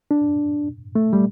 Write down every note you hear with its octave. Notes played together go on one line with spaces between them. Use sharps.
D4
A3
G3